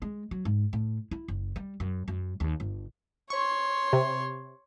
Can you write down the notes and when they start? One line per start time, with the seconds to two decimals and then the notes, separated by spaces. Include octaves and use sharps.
0.02 G#3
0.31 F#3
0.45 G#2
0.73 A2
1.11 E4
1.28 F#1
1.56 G3
1.80 F#2
2.08 F#2
2.40 D#2
2.60 G1
3.30 C#5 C6 C#6
3.93 C3